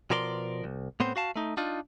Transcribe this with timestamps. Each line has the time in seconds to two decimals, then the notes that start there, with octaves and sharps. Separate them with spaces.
0.10 B2 F3 A#4 D5 G#5 C6
0.64 C2
1.00 A2 B3 C4 C5
1.16 F#4 F5 A5
1.36 A3 D#4
1.57 D4 D#4 F4